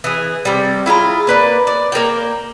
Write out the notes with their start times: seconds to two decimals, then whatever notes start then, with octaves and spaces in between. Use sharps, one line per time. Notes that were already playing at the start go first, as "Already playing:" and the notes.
0.04 E3 G#4
0.45 C3 G3
0.86 E4 F4 G#4 A#5
1.27 A#3 B4 D5
1.67 D5
1.92 A#3 A#4 D5 G5